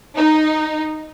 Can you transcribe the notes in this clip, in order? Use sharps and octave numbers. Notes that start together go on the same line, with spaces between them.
D#4